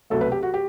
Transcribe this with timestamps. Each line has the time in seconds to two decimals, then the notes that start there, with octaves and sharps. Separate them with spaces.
0.10 C2 B2 F#3 A3 A4
0.21 B4
0.32 G4
0.43 F#4
0.54 G4